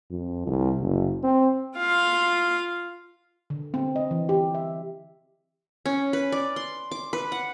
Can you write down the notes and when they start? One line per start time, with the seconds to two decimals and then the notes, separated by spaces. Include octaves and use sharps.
0.11 F2
0.47 C2
0.80 F#1
1.24 C4
1.78 F4 F5
3.50 D3
3.74 C4
3.96 D#5
4.11 E3
4.29 G4
4.55 E5
5.86 C#4
6.13 B4
6.32 D5
6.56 C6
6.91 D6
7.13 B4
7.32 F#5